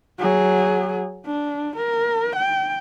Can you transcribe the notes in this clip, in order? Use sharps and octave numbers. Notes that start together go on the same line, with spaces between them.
F#3 G#4
D4
A#4
G5